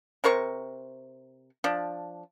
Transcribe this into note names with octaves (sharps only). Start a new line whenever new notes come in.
C3 A#4 C5 C#6
F3 D4